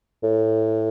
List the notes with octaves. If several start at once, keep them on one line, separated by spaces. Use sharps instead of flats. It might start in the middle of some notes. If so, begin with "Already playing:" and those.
A2